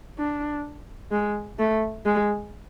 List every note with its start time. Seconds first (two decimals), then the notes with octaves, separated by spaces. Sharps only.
0.18 D4
1.11 G#3
1.59 A3
2.06 G#3